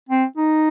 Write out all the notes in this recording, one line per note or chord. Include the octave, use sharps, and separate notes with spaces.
C4
D#4